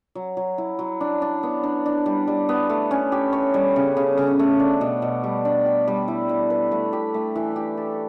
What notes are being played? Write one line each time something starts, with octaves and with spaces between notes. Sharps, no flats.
F#3
F#3
E4
F#3
D4
D4
B3
D4
D4
G3
G3
B3
A3
C#4
G4
C#5
G3
C#3
C#3
C#3
A3
D4
B2
B2
G3
D4
G4
G3
E4
E4
B4
A3
G4
A3
E3
G4
A4